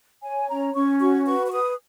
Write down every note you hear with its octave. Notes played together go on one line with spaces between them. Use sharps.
C#5 G#5
C#4 A#5
C#4 C#6
F#4 C#6
B4 C#6
C#6
B4 D#6